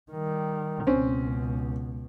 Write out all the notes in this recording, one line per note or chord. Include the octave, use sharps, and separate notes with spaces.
D#3 G3
C#2 B2 C4 C#4